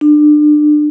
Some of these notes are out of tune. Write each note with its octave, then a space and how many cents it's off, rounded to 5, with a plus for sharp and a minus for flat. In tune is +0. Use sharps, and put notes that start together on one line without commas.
D4 +30